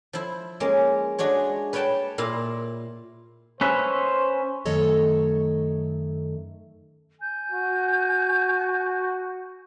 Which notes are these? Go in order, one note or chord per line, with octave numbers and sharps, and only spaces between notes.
F3 E4
G#3 A#3 C#4
G#3 D4 F#4 C#5
B4 C#5 F#5 G5 A5
A#2 E4 F5
C#4 B4 C5 E5
F#2 D#3 A3 A4 C#5 D#5
G#5 G6
F#4